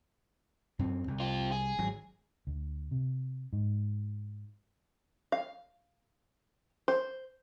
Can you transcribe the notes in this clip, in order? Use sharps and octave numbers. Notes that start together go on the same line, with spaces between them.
F#2 C4
C2
C4 F4
G#4
G#1 F#3
D2
C3
G#2
F5
C5